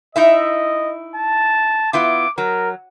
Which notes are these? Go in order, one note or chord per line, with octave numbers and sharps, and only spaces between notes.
D#4 E4 D#5 E5
A5
B3 E4 F4 D6
F#3 A#4